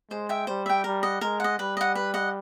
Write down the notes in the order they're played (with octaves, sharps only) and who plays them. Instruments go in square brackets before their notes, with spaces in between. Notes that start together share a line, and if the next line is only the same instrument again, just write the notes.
[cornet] G#3 [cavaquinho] C5
[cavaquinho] E5 G5
[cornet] G3 [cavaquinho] C5
[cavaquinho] E5 G5
[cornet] G3 [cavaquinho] A#4
[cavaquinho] D#5 F#5
[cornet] G#3 [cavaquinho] A#4
[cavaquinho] D#5 F#5
[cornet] G3 [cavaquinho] B4
[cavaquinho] D#5 F#5
B4
D#5 F#5